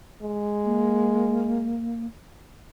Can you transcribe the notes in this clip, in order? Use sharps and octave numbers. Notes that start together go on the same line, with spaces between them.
G#3
A#3